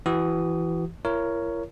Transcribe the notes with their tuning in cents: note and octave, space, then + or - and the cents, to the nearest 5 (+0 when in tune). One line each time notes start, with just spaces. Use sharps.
E3 +15 F#4 +35 D#6 +0
E4 +45 A#4 +0 C#5 +10